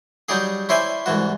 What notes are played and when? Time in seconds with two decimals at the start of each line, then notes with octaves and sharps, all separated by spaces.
0.29 F#3 G3 D#4 G4 G#4
0.69 C#4 E4 C5 D5 E5 G#5
1.06 C2 G#2 E3 F#4